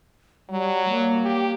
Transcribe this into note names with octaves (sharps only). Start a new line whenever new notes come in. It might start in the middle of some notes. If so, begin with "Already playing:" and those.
F#3 G3
A#3
G4